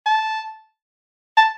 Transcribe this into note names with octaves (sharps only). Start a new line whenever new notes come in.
A5
A5